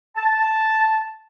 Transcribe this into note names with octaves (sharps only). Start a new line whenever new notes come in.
A5